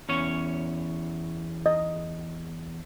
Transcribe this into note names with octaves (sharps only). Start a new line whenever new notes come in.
E2 C#4 C#5
D#5